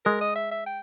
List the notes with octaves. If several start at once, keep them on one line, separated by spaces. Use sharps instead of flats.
G#3 A#4
D#5
E5
E5
G5